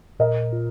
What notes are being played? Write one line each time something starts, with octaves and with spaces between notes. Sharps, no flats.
A#2 A#4 D#5
F4